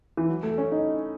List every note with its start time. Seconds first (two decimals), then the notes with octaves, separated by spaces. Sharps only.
0.17 E3
0.29 F#3
0.43 A3
0.58 C#4
0.72 D#4